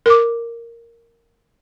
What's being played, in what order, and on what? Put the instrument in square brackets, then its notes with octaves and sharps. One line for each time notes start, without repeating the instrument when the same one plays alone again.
[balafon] A#4 D6